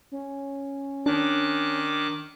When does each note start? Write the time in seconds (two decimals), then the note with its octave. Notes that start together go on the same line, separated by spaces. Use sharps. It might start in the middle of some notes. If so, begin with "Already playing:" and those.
0.12 C#4
1.06 D#3 D4 D6 F#6